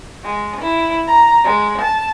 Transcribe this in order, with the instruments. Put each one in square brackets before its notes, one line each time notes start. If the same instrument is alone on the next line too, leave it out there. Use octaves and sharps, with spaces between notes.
[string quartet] G#3
E4
A#5
G#3
A5